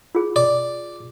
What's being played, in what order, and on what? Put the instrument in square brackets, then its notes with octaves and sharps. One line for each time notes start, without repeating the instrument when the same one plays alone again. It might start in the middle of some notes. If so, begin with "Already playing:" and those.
[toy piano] F4 G#4
[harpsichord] D5